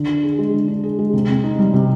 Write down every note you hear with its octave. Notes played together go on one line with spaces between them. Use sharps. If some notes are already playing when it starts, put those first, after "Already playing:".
Already playing: D3
D4
G#4
G#3
D3
D4
G#4
G#3
C3
C4
D#4
G3
C3